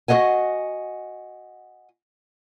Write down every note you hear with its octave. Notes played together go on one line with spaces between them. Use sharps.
F#4 A4 D#5 F#5 G#5